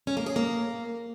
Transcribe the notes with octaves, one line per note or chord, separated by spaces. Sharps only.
C#4
A#3
G#4
A#3